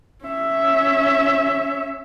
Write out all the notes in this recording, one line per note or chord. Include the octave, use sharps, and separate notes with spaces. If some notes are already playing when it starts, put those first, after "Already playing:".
C#4 E5